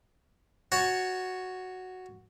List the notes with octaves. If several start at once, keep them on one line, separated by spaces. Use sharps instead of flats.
F#4 C#5 A5